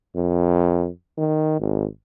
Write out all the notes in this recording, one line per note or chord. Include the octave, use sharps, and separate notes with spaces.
F2
D#3
G#1